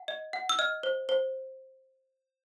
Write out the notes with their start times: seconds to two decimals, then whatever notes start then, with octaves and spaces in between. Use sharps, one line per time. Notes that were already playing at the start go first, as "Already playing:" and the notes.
Already playing: F#5
0.08 D#5
0.33 F#5
0.49 E6
0.59 D#5 F6
0.83 C5
1.09 C5